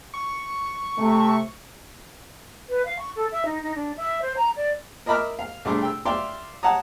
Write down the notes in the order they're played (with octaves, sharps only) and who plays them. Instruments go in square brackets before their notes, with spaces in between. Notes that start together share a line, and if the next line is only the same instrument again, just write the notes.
[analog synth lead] C#6
[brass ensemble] C3 A3
[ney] B4
F5
C#6
A4
E5
D#4
D#4
D4
E5
C5
A#5
D5
[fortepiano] A#4 D#5 E5 B5 D6 F6
F5
C2 A3 D4 G#4 C6 D6
G5 E6
D5 E5 F5 G5 C6 D6
C#5 F#5 A5 A#5 D#6